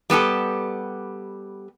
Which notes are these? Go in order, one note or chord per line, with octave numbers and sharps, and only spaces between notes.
G3 B3 G4 A4